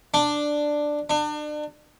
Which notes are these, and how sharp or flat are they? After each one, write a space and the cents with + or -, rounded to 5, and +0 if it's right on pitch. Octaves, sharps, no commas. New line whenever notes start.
D4 +5
D4 +35